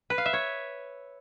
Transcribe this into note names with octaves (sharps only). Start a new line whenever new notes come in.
B4
F5
E5
C#5